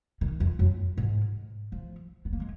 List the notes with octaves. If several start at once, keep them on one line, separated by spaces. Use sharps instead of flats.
D#3
F2
F#2
G#2
F3
B3
A#3
G#3